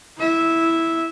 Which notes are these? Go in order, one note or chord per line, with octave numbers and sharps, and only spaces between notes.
E4 E5